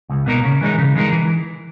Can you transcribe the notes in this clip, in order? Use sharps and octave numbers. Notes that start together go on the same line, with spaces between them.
C#2
B2 A#3 D#4 A#4
C#3
E3 G#3 D#4 A#4
C#3
E3 G#3 D#4 A#4
E3